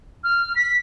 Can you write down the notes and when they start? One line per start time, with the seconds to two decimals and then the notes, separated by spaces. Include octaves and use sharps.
0.24 F6
0.56 B6